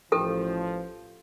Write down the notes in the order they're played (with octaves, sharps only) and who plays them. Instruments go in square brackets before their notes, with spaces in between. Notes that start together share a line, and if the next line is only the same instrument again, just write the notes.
[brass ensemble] A1 F3 [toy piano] G4 A4 G5